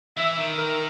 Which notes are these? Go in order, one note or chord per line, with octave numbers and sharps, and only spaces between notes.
E3 E5
D#3
A#4